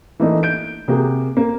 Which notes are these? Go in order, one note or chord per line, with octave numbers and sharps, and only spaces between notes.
E3 A3 A#3 D4 D#4
G6 D7
C3 A#3 F#4 G#4
A#3